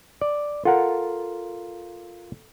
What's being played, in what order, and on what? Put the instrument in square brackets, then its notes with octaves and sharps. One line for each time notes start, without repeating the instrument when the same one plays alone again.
[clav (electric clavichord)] D5
[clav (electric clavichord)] F4 A#4 [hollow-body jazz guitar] A4 F#5